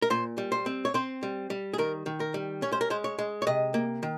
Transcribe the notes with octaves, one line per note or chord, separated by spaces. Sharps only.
A#4
A#2 C5
G3
C5
C4
C#5
C4 C5
G3
G3
G#4
D#3 A#4
D#3
A#4
G3
C#4 C#5
C5
A#4
G#3 C5
C#5
G#3
C#5
C3 D#5
A#3
D#3